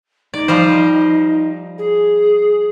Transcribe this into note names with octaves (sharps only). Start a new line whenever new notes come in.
D#4 D5
F3 G3 C5
G#4